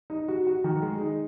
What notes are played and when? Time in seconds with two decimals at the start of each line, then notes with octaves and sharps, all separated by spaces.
0.10 D#4
0.28 F#4
0.47 F#4
0.64 D#3
0.82 G#3
1.01 D#4